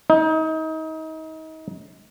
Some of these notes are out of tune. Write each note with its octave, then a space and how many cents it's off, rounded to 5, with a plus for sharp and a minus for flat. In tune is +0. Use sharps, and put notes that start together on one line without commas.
D#4 +30